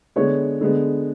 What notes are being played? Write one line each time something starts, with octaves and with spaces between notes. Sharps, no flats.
D3 G#3 B3 C#5
D3 G#3 B3